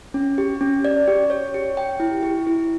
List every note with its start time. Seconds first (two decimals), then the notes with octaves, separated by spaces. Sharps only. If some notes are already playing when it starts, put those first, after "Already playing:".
0.14 C#4
0.38 G4
0.61 C#4
0.85 D5
1.08 G4
1.30 C#5
1.54 G4
1.77 G5
2.00 E4
2.23 G4
2.47 E4